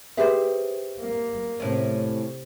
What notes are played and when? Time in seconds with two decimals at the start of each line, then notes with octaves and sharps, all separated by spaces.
0.17 G4 G#4 B4 C5 E5
0.99 A#3
1.60 A2 C3 C#4